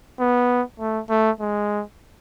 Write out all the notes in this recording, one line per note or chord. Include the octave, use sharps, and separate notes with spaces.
B3
A3
A3
G#3